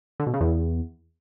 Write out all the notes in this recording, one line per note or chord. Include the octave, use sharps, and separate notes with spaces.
D3
B2
C#3
E2